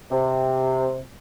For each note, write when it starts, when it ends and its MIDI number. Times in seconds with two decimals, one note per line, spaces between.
0.11 0.98 48